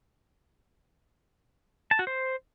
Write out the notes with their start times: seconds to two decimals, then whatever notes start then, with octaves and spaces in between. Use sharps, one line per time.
1.91 A5
1.99 F#4
2.07 C5